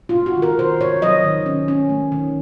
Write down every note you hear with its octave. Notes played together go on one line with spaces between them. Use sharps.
F4
C3
F#4
D#3
A#4
C3 C5
C3 C#5
F#3 D#5
D#3
C#4
C#4
A3
D#3